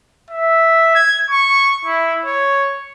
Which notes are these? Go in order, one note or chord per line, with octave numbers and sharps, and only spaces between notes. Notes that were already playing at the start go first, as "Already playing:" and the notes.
E5
G#6
C#6
E4
C#5